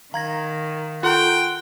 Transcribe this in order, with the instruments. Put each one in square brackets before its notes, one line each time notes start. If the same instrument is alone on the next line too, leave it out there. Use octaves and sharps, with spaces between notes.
[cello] D#3 [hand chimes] F5 [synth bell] A#5 G#6 A#6
[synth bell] F4 A4 A#5 [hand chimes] F#5 C6 F#6 [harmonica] G5